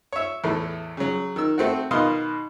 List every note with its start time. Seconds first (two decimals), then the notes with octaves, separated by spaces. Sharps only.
0.13 C#5 E5
0.44 E2 A2 A3
0.97 C#3 F#3
1.36 D#3 E6
1.58 A3 C4 F#4
1.91 B2 D#3 D#5 F5 C6